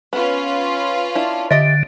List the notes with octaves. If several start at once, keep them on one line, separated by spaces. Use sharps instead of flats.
B3 C#4 F4 B4
D4 E4
D3 G4 D#5 E5